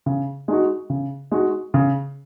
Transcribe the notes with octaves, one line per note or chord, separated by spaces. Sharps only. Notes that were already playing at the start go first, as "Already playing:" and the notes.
C#3
G#3 D#4 F#4
C#3
G#3 D#4 F#4
C#3